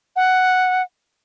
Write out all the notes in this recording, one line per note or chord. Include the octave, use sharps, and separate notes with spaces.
F#5